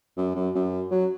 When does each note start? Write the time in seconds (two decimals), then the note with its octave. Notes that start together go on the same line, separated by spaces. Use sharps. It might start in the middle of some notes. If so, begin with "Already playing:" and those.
0.17 F#2
0.35 F#2
0.55 F#2
0.91 F#3